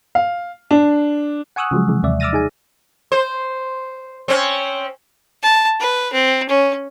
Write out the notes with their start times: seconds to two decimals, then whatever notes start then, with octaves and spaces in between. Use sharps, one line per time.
0.15 F5
0.71 D4
1.56 F#5 G#5 C#6 D#6 E6 F#6
1.71 C#3 F3 F#3 G#3
1.88 C3 E3 G#3
2.03 D#2 C3 D5 E5
2.20 D6 E6 F6 A6 A#6 D#7
2.33 D#4 G#4 G#5
3.12 C5
4.28 C4 C#4
5.43 A5
5.80 B4
6.12 C4
6.49 C#4